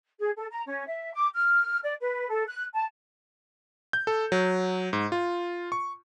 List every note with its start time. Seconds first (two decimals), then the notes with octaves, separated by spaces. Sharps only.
0.19 G#4
0.36 A4
0.51 A#5
0.66 C#4
0.86 E5
1.13 D6
1.34 F6
1.83 D5
2.00 B4
2.30 A4
2.47 F#6
2.74 A5
3.93 G6
4.07 A4
4.32 F#3
4.93 G#2
5.12 F4
5.72 C#6